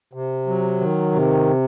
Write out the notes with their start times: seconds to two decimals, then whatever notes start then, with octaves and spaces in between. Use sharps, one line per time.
0.13 C3
0.47 F#3
0.80 D#3
1.13 C3